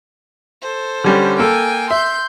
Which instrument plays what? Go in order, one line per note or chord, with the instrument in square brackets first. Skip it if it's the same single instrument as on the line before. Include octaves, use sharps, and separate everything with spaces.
[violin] A4 C5
[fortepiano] D3 G3 C#4
[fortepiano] A#3 A4 [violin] G5 G#5
[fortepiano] E5 [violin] C6 G6